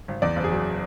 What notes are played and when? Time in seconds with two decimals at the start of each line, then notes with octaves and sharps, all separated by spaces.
0.08 G#1
0.22 E2 D5
0.36 F#1
0.44 G#4
0.51 F#3